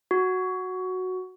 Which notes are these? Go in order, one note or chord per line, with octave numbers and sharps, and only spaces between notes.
F#4